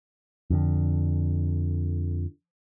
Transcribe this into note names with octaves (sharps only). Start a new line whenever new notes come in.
F2 D3